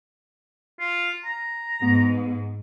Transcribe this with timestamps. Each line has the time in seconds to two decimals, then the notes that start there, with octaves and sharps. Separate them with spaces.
0.80 F4
1.25 A#5
1.82 G#2 B3